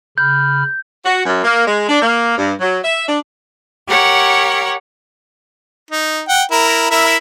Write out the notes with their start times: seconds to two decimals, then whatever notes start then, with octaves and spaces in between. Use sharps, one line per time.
0.18 C#3 B5 F6 G6
1.05 F#4
1.25 F#2
1.43 A#3
1.66 G#3
1.89 D4
2.02 A#3
2.37 G2
2.60 F#3
2.83 E5
3.07 D4
3.87 G4 A#4 C#5 F#5 C#6
5.91 D#4
6.29 F#5 G5
6.51 E4 A#4
6.91 E4 A#4 E5